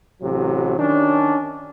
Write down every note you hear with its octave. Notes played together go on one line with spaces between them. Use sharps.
A1 C3 F#3
D#3 C#4 D4